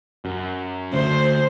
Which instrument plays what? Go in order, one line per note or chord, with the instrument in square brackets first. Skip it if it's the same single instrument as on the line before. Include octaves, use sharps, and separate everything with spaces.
[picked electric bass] F#2
[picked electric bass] D2 [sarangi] C5